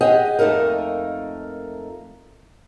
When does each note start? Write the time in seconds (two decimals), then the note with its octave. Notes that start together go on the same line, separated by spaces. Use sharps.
0.01 G4 G#4 D#5 F#5
0.39 F2 A3 A#3 D#4 A#4